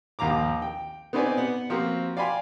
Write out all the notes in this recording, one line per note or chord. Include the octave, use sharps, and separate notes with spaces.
A#1 D#2 F5 A#5 D6
G5
B3 C4 D#4 B4 D5 G#5
B3 F#5
F3 A#3 C4 F#4
D5 F5 G5 G#5 B5 C6